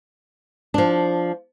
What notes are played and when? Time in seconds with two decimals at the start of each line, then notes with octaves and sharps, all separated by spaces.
0.74 F3 D4